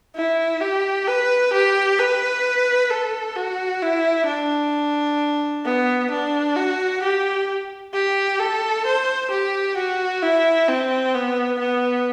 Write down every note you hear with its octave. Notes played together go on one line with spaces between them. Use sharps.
E4
G4
B4
G4
B4
A4
F#4
E4
D4
B3
D4
F#4
G4
G4
A4
C5
G4
F#4
E4
C4
B3
B3